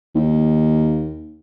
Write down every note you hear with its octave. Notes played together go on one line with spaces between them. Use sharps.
D#2